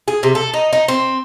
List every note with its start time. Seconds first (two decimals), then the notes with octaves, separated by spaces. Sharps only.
0.08 G#4
0.23 C3
0.35 A4
0.54 D#4
0.73 D#4
0.88 C4